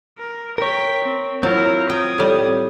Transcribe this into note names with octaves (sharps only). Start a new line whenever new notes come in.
A#4
A#4 C#5 G5 B6
C4
F#3 C4 E4 F4 A#4
G5 D#6 G#6
A2 G3